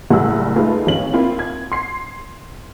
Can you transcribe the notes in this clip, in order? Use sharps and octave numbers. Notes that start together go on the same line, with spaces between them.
F#1 A2 G3 G#3 F#5 E6
G#3 A3 D#4 F4 B4
G#1 C#4 F#7
A#3 C4 E4 F4
G#6
C6 C7